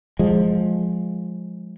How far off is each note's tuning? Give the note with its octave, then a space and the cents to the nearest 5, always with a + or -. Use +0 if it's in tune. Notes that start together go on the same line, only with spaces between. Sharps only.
F3 +15 G#3 +0